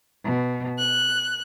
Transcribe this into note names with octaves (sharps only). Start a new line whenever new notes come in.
B2
F#6